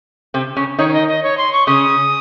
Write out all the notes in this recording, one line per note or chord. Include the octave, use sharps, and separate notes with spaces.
C3 C4
C#3 C#4
D#3 D#4 C#5
C#5
D#5
D#5
C#5
C6
C#6
C#3 C#4 D#6